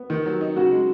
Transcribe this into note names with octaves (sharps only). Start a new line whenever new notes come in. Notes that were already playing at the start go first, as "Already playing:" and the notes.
Already playing: B3
D#3
F#3
D#4
C#3 F#4
G#3